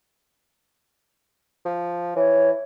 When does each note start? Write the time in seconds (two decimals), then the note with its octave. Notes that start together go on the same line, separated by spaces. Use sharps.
1.65 F3
2.16 E3 C#5